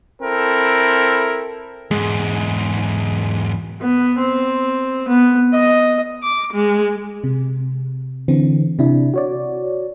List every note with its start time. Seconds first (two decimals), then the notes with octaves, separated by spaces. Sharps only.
0.23 C4 E4 A4 A#4
1.91 E2 G#2 G#3
3.81 B3
4.18 C4
5.08 B3
5.54 D#5
6.23 D6
6.53 G#3
7.24 C3
8.28 D3 E3 C4
8.79 C3 D4 E4
9.14 F#4 C#5 D5